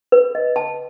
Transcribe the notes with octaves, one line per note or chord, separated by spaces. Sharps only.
B4
D#5
A5